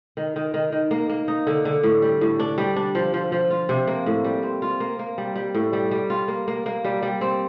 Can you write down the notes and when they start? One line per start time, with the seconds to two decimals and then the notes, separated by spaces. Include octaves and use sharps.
0.17 D#3
0.36 D#3
0.54 D#3
0.72 D#3
0.91 A#3
1.09 A#3
1.28 D#4
1.47 D3
1.65 D3
1.83 A2
2.02 G3
2.21 A2
2.39 D4
2.58 G3
2.76 D4
2.95 F3
3.14 F3
3.32 F3
3.51 F4
3.69 C3
3.87 A#3
4.06 A2
4.24 G3
4.43 C4
4.62 F4
4.80 A#3
4.99 A#3
5.18 G3
5.36 G3
5.54 A2
5.73 G3
5.91 G3
6.10 F4
6.28 A#3
6.48 A#3
6.66 A#3
6.84 G3
7.03 G3
7.21 C4